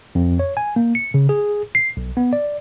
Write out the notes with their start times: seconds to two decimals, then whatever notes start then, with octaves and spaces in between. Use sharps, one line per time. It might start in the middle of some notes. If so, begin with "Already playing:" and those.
0.15 F2
0.39 C#5
0.57 G#5
0.76 A#3
0.95 C#7
1.14 C#3
1.29 G#4
1.75 C7
1.97 B1
2.17 B3
2.33 D5